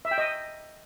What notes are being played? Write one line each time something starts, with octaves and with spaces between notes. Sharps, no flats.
E5
G5
D#5